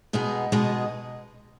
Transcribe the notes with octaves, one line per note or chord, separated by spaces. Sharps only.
B2 G#3 B3 D#4 G#4
B2 G#3 B3 D#4 G#4